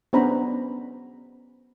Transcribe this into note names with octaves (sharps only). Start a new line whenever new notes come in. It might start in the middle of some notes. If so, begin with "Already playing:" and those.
B3 C#4 D4 C5 A#5 B5